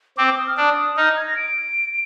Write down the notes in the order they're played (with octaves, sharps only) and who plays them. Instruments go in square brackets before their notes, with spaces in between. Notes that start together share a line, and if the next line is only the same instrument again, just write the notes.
[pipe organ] C4 [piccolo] D6
[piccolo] D6
D#6
F6
[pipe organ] D4 [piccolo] D#6
[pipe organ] D#4 [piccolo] F6
[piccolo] G#6
A#6
D7